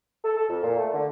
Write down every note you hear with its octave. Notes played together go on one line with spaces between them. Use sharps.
A4
A4
F2
A#2
A3
D3